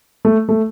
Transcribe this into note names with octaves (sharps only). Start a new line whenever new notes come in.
A3
A3